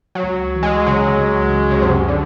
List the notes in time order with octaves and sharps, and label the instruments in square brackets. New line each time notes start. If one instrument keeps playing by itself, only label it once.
[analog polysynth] F#3
[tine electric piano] C#2
E3
[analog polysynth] G#3
[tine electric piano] C#3 [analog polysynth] F#3
[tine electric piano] C#2
C#2
[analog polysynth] C#3
[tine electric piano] F#2 [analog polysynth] C3
[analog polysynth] D3